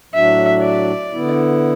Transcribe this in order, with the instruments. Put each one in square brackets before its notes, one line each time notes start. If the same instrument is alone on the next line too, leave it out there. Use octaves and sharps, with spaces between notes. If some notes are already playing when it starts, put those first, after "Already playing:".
[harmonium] A2 F#3 D4 F#4 [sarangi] E5
[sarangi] D5
[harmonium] D3 B3 E4